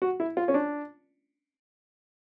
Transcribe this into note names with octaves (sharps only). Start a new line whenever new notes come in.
F#4
E4
F4
C#4
D4